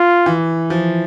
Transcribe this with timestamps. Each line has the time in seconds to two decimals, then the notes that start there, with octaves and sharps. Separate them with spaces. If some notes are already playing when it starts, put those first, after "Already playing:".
Already playing: F4
0.26 E3
0.70 F3